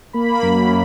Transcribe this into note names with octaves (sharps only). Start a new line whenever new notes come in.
A#3 B5
F#2